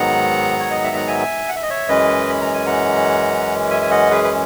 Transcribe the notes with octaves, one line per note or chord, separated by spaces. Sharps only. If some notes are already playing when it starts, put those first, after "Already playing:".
Already playing: G#2 D#3 F#3 B3 F#5 A#5
C#5
D#5
E5
F#5
E5 G#5
F#5
E5
D#5
C#5 E5
F#2 E3 G#3 C#4 B4 D#5
B5
A#5
G#5
F#5 A#5
E5 G#5
G#5
D#5 F#5
G#4 B4
B4